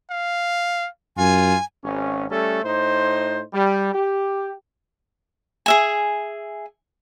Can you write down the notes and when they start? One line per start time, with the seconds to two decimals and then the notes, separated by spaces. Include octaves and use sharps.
0.10 F5
1.18 F#2 F4 G#5
1.83 G#1 C#4
2.30 G3 A3 C#4 A4
2.64 A2 D#4 C5
3.54 G3
3.93 G4
5.66 G#4 E5 G#5